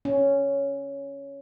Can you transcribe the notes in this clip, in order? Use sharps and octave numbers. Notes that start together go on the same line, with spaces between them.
C#4